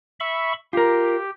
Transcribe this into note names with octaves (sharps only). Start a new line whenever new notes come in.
E5 B5 C#6
F4 G4 A#4